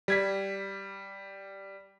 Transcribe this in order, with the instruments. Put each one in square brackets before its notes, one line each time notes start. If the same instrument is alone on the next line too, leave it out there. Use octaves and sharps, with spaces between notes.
[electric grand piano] G3 G#6 B6